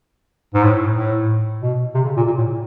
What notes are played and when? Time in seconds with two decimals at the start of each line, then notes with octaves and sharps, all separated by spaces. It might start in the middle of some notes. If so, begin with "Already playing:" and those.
0.54 G#2
0.64 A2
0.96 A2
1.62 B2
1.94 C3
2.05 C#3
2.16 A#2
2.27 A#2
2.38 A2